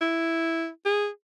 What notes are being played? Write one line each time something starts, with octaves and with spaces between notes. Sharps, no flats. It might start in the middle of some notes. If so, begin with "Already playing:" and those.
E4
G#4